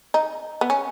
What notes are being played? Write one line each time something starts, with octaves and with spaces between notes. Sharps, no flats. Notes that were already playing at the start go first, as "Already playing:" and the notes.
D#4
B3
C#4